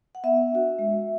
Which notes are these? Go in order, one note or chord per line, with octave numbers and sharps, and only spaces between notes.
F#5
B3 E5
D4 F#4
G#3